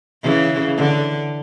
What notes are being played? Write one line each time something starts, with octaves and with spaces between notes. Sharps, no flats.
C#3 E3
D3